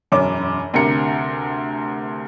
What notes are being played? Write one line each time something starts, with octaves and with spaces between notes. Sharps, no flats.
E1 F#2 C#4 D6
D2 C3 A#4 C#7